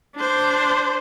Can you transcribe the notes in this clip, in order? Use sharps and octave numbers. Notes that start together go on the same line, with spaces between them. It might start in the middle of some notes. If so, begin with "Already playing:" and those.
D4 C5